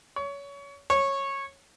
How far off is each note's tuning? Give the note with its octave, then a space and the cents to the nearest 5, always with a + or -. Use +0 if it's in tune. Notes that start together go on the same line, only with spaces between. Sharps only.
C#5 +25
C#5 -15